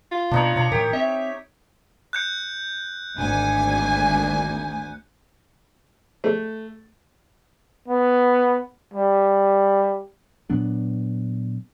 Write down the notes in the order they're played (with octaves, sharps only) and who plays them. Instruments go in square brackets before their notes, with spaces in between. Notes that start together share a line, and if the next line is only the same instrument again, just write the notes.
[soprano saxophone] F4
[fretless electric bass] B2 A#3 B3 [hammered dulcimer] D4 D#4 C#5
[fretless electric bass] B2 [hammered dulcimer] C#5 A#5
[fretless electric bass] A2 E3 [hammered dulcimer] G4 [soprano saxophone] A#4
[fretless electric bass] C4 [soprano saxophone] E5
[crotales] F#6 G6 C#7
[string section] G#1 D2 G#5
[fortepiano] A3
[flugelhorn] B3
G3
[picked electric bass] A#2 F#3 B3 D4